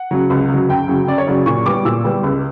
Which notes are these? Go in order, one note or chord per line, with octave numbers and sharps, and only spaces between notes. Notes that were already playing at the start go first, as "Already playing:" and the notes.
Already playing: F#5
C#3 F#3
C#2
C#3 F#3
F#2 G5
C#3 F#3
F#2 D5
C#5
C#3 F#3 D5
A#2 C#6
G3 B3 D6
A#2 E6
G3 B3
C#2